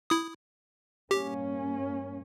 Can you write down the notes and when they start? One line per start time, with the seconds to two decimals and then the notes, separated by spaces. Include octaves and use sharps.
0.10 E4 D#6
1.11 G2 A#3 C#4 G4